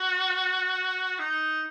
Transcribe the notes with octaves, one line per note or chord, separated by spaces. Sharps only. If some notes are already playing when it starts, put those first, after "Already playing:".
Already playing: F#4
D#4